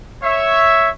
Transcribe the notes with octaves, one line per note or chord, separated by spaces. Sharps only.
C#5 E5